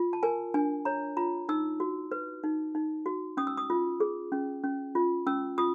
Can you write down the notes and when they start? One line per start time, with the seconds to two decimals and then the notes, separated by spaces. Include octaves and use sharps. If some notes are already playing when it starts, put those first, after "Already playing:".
Already playing: F4
0.13 A5
0.23 A#4 G#5
0.54 D4 G#5
0.85 C#5 A#5
1.17 F4 A#5
1.49 D#4 E6
1.80 F#4
2.12 B4
2.43 D#4
2.75 D#4
3.06 F#4
3.37 C#4 D#6
3.47 E6
3.57 D#6
3.70 F4
4.00 G#4
4.32 C#4
4.64 C#4
4.95 F4
5.26 C#4 E6
5.58 F4 D#6